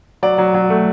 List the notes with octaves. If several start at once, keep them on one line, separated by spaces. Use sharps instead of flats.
F#3 D5
F#3
F#3
A3